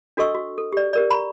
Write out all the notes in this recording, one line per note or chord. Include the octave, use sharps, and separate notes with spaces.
D4 F#4 A4 D#5 C#6 E6
F#4
A4
G4 D5
G4 A#4 D5
A#5 B5 C#6